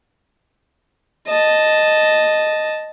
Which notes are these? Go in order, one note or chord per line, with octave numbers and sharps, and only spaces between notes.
D#5 A5